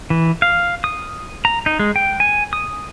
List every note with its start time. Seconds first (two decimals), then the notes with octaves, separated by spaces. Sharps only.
0.10 E3
0.42 F5
0.84 D#6
1.45 A#5
1.66 D#4
1.79 G#3
1.96 G5
2.20 G#5
2.53 D#6